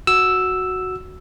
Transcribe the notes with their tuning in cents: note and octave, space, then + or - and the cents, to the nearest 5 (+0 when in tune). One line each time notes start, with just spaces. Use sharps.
F#4 +0 E6 +0